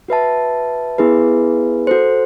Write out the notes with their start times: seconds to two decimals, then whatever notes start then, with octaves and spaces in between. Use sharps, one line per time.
0.08 F#4 B4 E5 A5
0.98 B3 E4 G#4 B4
1.87 F#4 A4 C5